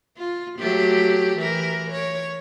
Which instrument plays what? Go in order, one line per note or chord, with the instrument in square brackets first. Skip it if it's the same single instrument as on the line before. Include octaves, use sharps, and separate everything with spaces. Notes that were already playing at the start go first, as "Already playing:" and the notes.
[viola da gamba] F4
F#3 A3 G4
E3 A#4
C#5